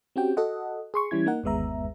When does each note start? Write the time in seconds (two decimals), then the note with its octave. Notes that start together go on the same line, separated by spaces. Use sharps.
0.16 C4 C#4 F#4 G4 G5
0.37 F#4 A4 D#5 F#5
0.94 G#4 C6 C#6
1.11 E3 G3 C#4 E4 G#6
1.26 A#3 D#4 A#4 F#5
1.44 G1 D#2 G#3 B3 E5 A#5